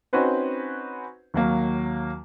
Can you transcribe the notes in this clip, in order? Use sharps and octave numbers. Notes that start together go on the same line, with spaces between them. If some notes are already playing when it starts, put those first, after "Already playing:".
C4 C#4 D#4 F#4 B4 C5
D#2 F#3 A#3